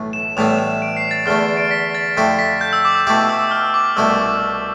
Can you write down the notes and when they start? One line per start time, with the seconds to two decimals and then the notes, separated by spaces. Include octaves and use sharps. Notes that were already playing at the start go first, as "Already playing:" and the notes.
Already playing: B1 A2 E3 A3
0.13 E7
0.37 A1 A2 E3 G3 B3 F7
0.59 E7
0.82 D7
0.97 C7
1.11 A6
1.26 E2 D3 A3 F6
1.57 D7
1.71 B6
1.95 A6
2.17 F2 D3 A3 E4 G4
2.39 B6
2.61 G6
2.73 E6
2.85 D6
2.95 E6
3.07 B2 A3 E4 G4 D6
3.29 E6
3.51 F6
3.74 D6
3.96 C2 B2 A3 E4 E6
4.19 D6